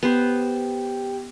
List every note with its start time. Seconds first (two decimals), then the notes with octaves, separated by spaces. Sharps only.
0.03 B3 G4 C5